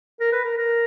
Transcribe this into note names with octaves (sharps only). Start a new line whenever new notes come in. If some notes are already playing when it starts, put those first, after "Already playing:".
A#4
B4
A#4
A#4